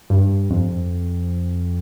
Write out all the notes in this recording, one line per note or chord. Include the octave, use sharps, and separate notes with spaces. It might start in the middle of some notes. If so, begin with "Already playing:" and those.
G2
F2